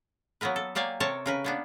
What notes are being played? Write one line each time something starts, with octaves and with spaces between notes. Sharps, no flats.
F#3 A#3 B3 A#4 B4
A4
F#3 A#3 G4 D5 G#5
C3 A4 A#4 C#5 A5
C#3 A#4 B4
A#3 B3 D4